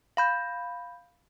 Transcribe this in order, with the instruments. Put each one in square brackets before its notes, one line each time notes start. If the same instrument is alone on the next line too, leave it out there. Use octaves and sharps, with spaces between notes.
[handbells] F5 B5 G6